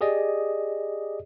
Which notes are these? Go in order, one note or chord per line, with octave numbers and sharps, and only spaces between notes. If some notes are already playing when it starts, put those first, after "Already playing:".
G4 G#4 D5 D#5